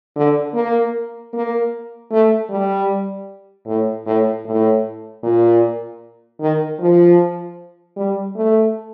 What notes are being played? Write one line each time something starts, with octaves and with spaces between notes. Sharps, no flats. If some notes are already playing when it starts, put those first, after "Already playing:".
D3
A#3
A#3
A3
G3
A2
A2
A2
A#2
D#3
F3
G3
A3